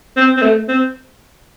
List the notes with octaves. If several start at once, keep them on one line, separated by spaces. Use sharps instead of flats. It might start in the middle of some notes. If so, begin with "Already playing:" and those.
C4
C4
A3
C4